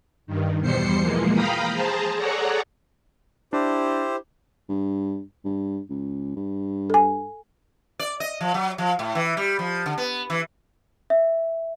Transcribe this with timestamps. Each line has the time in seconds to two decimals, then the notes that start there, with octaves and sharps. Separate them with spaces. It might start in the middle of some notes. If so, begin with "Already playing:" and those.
0.27 G2 D#3
0.60 E2 B2 G3 C5 C7 C#7
1.00 E3 F3 G#3 A#3
1.32 F5 G5 A#5 B5 D#6
1.73 G#4 C5 A5 A#5
2.16 G#4 A4 C#5 D5 F#5 A#5
3.53 D4 E4 G4 C5
4.69 G2
5.45 G2
5.90 C#2
6.36 G2
6.90 A4 G#5
7.99 D5
8.20 D#5
8.41 F3
8.54 F#3
8.78 F3
8.99 A2
9.15 E3
9.37 G3
9.59 F3
9.86 D3
9.98 B3
10.30 E3
11.10 E5